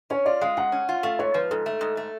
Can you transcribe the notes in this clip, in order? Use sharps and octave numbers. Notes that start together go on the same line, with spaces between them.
C#4 C#5
F4 D5
G#3 F5
G#2 F#5
C#4
F4
A3 F5
G#2 C#5
F3 B4
G#2 A4
A3
G#2
A3